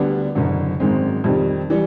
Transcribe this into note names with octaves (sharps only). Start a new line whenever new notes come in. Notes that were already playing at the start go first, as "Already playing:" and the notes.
Already playing: D2 D3 G3 B3 D4
F#1 F#2 D3
G#1 F#2 D#3 G#3 C4
F2 C3 D#3 G3
E3 G3